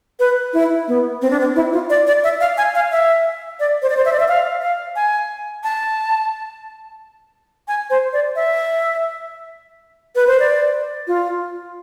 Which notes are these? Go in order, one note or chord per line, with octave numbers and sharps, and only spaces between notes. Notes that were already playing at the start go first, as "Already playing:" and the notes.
B4
E4
B3
C4
D4
C4
E4
F4
D5
D5
E5
F5
G#5
F5
E5
D5
C5
D5
C5
E5
D5
E5
F5
F5
G#5
A5
G#5
C5
D5
E5
B4
C5
D5
F4